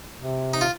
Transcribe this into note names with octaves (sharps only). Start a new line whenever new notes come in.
C3
D#4
F4